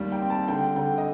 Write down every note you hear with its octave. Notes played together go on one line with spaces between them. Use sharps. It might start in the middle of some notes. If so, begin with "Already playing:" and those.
Already playing: D#2 G3
G5
C4
A5
D3 G5
D3 G5
D#5